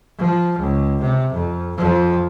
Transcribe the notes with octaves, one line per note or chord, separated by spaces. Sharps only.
F3
C#2
C3
F2
F2 F3